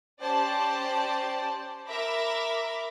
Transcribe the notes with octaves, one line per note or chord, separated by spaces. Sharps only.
C#4 G4 C5 D5 A5
A#4 E5 A#5 B5 D6